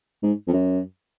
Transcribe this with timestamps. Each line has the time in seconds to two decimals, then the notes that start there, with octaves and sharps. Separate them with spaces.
0.23 G#2
0.48 F2
0.53 F#2